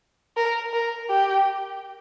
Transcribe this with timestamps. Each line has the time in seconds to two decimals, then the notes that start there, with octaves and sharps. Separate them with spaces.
0.37 A#4
0.73 A#4
1.09 G4